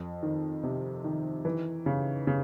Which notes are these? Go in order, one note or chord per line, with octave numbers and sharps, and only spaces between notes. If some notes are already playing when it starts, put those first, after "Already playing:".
Already playing: F2
D#3
C3
D#3
E3
C#3
C#3